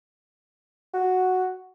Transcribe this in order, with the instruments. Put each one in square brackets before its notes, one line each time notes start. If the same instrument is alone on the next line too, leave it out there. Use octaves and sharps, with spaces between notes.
[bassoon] F#4